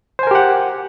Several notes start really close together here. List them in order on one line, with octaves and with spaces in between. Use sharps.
C5 G#5 A#4 G4 F#5